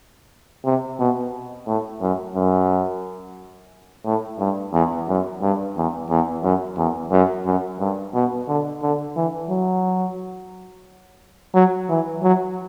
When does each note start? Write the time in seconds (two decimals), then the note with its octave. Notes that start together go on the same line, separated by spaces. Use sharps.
0.65 C3
0.99 B2
1.67 A2
2.02 F#2
2.35 F#2
4.06 A2
4.39 G2
4.73 E2
5.08 F#2
5.41 G2
5.76 E2
6.10 E2
6.43 F#2
6.77 E2
7.12 F#2
7.46 F#2
7.80 G2
8.14 B2
8.48 D3
8.82 D3
9.17 E3
9.50 F#3
11.54 F#3
11.89 E3
12.23 F#3